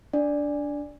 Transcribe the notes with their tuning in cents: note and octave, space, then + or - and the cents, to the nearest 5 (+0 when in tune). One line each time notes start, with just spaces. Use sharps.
D4 -15 D5 +0